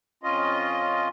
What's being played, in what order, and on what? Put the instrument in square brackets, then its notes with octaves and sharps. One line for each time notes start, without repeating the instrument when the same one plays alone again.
[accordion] F2 C#4 F4 D#5